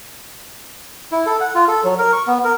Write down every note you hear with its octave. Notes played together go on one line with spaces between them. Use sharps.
E4
A4
F#5
F4
A4
F#3
A#4
C#6
B3
A#4